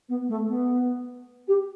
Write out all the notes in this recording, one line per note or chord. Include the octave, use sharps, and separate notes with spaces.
B3
A3
B3
G4